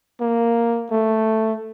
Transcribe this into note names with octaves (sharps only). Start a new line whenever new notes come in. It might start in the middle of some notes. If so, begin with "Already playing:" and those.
A#3
A3